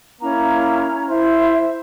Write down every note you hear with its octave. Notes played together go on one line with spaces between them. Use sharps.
A#3 C#4 E4 A#5
E4 C5 E5